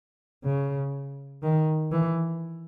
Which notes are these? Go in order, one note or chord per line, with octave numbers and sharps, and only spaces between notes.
C#3
D#3
E3